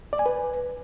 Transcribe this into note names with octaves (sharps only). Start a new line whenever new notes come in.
D5
G#5
B4